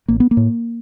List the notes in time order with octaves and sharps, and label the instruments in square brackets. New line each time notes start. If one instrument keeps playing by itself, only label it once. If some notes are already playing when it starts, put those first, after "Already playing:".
[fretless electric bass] A1 A#3
B3
A#3
A2